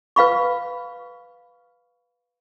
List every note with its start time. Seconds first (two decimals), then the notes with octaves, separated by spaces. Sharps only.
0.16 B4 F5 B5 C#6